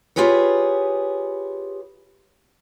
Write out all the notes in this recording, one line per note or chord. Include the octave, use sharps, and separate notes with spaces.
F4 G4 G#4 B4 C#5